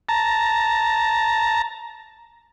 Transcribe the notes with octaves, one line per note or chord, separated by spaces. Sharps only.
A5 A#5